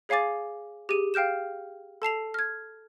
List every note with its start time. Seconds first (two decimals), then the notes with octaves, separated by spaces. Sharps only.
0.09 G#4 C#5 F5 G#5 D6 A6
0.89 G4 G#4 D#7
1.14 F5 G5 F6 G6 E7
2.02 A4 A5 C7 F7
2.34 F6 G#6